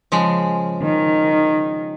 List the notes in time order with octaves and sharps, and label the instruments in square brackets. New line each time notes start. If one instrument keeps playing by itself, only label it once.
[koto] C#3 F3 G#3
[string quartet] D#3